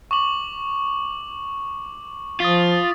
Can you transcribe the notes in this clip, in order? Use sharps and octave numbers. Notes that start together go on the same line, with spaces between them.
C#6 D6 F#7
F3 F4 D#6 A6 B6